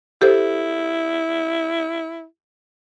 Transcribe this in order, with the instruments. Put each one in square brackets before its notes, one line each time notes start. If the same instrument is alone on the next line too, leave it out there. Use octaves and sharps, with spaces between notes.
[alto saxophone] E4 [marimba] G4 A4 C5